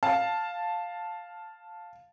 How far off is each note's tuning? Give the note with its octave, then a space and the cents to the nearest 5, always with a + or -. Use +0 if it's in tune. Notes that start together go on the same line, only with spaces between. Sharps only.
F5 +5 A5 +0